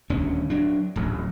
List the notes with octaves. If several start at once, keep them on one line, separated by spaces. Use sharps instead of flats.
D#1 D2 C#4
F#3 D4
D1 A1 F#3